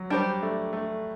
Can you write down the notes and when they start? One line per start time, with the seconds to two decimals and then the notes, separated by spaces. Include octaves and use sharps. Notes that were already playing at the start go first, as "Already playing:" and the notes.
Already playing: F#3
0.10 G3 D4 G4 C5
0.42 A3
0.73 A3